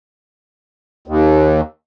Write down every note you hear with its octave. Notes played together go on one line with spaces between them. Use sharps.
D#2